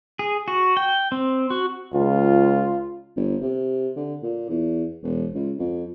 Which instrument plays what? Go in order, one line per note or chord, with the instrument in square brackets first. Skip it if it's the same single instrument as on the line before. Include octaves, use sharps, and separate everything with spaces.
[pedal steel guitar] G#4
F#4
G5
C4
F#4
[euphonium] C#2 [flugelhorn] F4
[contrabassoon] G1
C3
D3
A#2
E2
E1
C#2
F2